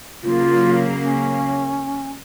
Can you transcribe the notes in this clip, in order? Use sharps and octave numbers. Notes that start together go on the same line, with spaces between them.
C#3 F#3 A#3 F4
C#4